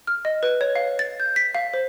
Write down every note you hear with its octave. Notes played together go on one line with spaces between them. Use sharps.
F6
D#5
B4
C#5
F5
A6
G6
B6
F5
C5